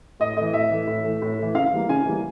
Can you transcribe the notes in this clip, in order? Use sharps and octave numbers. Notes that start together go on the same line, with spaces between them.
A2 D#5
E3 A3 D#5
A2 E5
E3 A3
A2
E3 A3
A2
E3 A3
C#3 F5
E3 G3 A#3
C#3 G#5
E3 G3 A#3